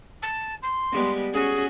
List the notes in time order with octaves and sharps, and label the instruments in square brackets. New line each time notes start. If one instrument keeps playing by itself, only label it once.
[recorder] A5
C6
[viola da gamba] G3 G#3 B3
[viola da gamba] C#4 F#4 [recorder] G#4